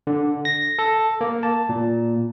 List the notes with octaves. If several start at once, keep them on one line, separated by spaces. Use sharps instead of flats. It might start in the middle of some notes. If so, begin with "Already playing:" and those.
D3
A#6
A4
A#3
A5
A#2